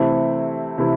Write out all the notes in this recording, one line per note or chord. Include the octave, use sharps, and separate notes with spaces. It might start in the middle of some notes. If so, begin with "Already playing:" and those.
Already playing: C3 E3 A3 C4 E4
C3 E3 A3 C4 E4